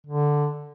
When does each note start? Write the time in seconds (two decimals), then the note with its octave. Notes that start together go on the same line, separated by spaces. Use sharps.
0.07 D3